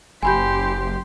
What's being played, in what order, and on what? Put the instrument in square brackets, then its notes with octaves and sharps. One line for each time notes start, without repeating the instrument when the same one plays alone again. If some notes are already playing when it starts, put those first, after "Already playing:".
[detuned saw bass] F#1 [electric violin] G4 C6 [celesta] G#5 B5 G6